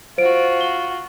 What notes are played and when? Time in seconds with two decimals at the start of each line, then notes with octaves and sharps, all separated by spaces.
0.18 F4 F#4 C5 D7
0.61 G7